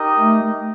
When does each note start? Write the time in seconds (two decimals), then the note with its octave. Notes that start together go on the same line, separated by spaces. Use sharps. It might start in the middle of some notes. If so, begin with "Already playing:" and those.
Already playing: D#4 G4 A#4 D#5
0.19 A3